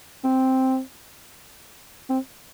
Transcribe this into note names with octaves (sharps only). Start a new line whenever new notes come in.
C4
C4